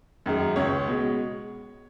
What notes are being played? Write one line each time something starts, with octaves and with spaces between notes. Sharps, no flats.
F#2 D#3 G#3
C#2 C#5
B2 G#3